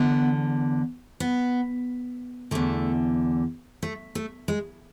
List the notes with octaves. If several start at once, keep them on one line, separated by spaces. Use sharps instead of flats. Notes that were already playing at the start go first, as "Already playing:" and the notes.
Already playing: E2 D3 B3
B3
E2 D3 A3
A3
A3
G#3